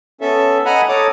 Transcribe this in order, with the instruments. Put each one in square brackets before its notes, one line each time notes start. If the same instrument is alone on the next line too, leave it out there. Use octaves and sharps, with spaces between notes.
[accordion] B3 C#4 A4 E5
D#5 F#5 G#5 A#5 B5
A4 C#5 A#5 D6 D#6